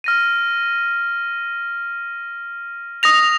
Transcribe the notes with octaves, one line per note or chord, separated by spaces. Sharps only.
F6 A#6 D#7
D#6 A#6 F7